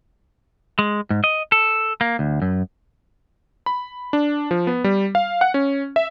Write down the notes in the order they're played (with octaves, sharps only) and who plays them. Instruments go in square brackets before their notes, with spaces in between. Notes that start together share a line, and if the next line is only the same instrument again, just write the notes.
[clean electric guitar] G#3
G#2
D#5
A4
A#3
D2
F#2
[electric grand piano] B5
D4
F3
B3
G3
F5
F#5
C#4
E5